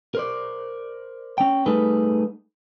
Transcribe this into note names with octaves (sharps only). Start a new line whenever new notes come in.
A#4 C5 D5
C#4 G5
G3 A3 D#4 G#4 A4 B4